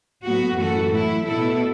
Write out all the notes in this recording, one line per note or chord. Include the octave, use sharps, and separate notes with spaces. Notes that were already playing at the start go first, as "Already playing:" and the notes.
A2 F#3 B3 F#4
F#2 E3 A3 F#4 A4
A2 A3 E4
B2 B3 E4 A4